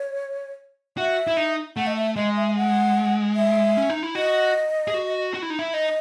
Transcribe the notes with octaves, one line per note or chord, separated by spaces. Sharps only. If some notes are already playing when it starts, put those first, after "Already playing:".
Already playing: C#5
F#4 E5
E4
D#4
A3 F#5
D#5
E5
G#3 D#5
E5
F#5
E5
C#4
D#4
E4
F#4 D#5
G#4
F#4
F#4
E4
D#4
E4
D#4 D#5